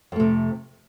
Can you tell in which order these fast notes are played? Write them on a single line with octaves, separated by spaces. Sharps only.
F2 A3 C3